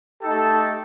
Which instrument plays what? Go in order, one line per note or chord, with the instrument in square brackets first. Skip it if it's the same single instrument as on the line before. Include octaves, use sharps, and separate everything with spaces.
[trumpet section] A3 D#4 G4 A4